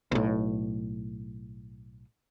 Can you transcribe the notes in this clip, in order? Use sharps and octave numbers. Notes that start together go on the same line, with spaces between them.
B1 A2